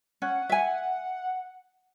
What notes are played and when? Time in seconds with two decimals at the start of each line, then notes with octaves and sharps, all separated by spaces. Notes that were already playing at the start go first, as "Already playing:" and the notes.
0.22 C#4 F#5
0.49 E5 G#5